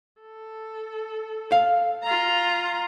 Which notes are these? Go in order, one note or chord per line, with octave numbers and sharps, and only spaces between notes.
A4
F5
F4 A#5